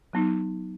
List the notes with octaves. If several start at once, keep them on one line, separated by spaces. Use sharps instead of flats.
F#3 B3 D#4